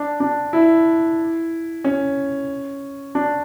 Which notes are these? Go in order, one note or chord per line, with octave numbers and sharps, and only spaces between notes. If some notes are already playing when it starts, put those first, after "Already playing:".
Already playing: D4
D4
E4
C#4
D4